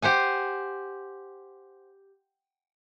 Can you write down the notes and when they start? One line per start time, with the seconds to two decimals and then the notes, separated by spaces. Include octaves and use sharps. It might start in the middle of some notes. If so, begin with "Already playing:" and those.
0.02 G4 C5 F#5 G#5